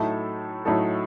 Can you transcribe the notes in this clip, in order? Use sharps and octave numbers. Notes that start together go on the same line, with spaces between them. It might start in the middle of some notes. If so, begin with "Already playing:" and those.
Already playing: A2 F#3 A3 D#4 A4
A2 F#3 A3 D#4 A4